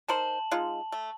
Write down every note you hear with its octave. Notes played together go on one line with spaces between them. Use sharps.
D#4 A#4 C5 A5 F#7
G#3 D#4 F4
A3